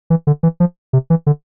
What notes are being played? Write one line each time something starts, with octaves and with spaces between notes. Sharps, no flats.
E3
D3
E3
F3
C3
E3
D3